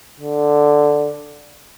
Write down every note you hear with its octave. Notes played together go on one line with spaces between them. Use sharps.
D3